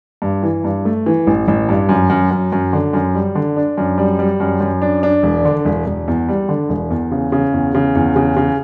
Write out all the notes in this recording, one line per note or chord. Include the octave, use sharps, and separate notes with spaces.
G2
E3
G2
A3
E3
A1
A1
G2
F#2
F#2
F#2
F#2
D3
F#2
G3
D3
D4
F#2
G3
G3
F#2
F#2
D4
D4
E1
D3
E1
E1
E2
G3
D3
E1
E2
C#3
C#3
E2
C#3
E2
C#3
C#3